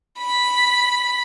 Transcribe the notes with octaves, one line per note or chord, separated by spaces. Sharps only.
B5 B6